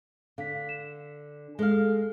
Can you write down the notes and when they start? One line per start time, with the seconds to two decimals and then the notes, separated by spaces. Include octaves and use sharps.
0.38 D3 F5 B6
0.69 E7
1.59 G#3 A4 F5 F6